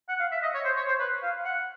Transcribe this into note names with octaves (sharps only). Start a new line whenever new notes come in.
F#5
F5
E5
D#5
C#5
C5
C#5
C5
B4
F5
F#5